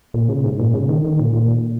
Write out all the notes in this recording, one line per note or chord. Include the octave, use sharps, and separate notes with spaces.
A#2
C#3
G#2
A#2
C#3
D#3
D#3
A#2
A#2